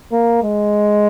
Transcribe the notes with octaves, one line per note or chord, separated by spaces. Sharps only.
A#3
G#3